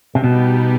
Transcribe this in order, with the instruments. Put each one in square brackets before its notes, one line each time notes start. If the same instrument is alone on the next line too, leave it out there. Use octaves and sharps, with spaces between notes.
[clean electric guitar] C3
[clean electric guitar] B2 [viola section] G3 B3 D#4 G4